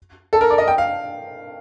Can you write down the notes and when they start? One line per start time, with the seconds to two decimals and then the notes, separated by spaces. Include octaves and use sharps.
0.33 A4
0.41 A#4
0.50 D5
0.58 D#5
0.68 G5
0.78 F5